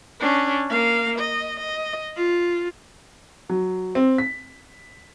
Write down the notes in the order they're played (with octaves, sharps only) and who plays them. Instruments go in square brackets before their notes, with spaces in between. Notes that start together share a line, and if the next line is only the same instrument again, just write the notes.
[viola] C#4 D4
A#3 F5
D#5
D#5
F4
[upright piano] F#3
C4
B6